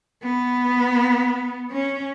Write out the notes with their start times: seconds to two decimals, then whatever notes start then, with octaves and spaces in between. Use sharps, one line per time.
0.23 B3
1.71 C#4